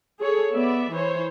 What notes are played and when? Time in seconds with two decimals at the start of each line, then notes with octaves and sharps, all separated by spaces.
0.19 G#4 A4 C#5
0.54 B3 D5 E5
0.91 E3 C5 C#5